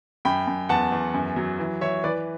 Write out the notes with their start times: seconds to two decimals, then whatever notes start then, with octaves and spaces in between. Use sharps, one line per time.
0.25 F#2 G5 B5
0.47 F#2
0.69 E2 F#5 A5
0.92 E2
1.14 F#2
1.36 F#3
1.59 E3
1.81 E3 C#5 E5
2.04 E3 B4 D5